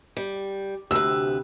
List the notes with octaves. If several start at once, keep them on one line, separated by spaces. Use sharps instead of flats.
G3
D2 C3 G4 B4 E6